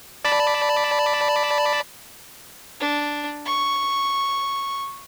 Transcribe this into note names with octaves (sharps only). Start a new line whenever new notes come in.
D5 A5 B5
D4
C#6